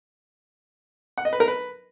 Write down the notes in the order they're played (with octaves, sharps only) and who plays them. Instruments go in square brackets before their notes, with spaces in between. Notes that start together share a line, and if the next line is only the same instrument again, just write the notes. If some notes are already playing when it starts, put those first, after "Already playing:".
[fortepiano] F#5
D#5
B4
A#4
B4